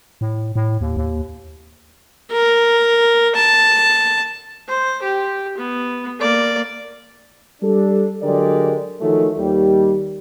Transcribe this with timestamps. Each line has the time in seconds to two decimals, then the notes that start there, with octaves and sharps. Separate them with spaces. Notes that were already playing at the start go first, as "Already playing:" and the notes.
0.21 A2
0.56 A2
0.81 D#2
0.97 D#2
2.32 A#4
3.35 A5
4.68 C5
5.03 G4
5.58 B3
6.20 A#3 D5
7.62 G3 D4 A4
8.23 D3 F#3 G#3 G4 A#4 D5
9.01 D#3 F3 F#3 G#3 A3
9.37 D#2 G3